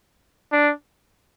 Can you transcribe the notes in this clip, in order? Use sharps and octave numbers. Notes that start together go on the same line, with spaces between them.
D4